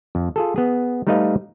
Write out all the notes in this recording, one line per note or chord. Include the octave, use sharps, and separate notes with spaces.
F2
F4 G#4 A4
B3 G#4
G3 A3 D#4 B4 D#5 F5